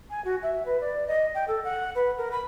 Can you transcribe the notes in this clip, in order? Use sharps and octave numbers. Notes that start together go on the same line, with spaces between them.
G#5
F#4
E5
B4
D5
D#5
G5
A4
F#5
B4
A#4
B5